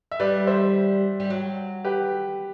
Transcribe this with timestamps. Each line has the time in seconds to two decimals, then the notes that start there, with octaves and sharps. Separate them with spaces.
0.12 E5
0.20 G3 B4 D5
0.47 C5 E5
1.20 G3
1.30 F#3
1.85 G4 B4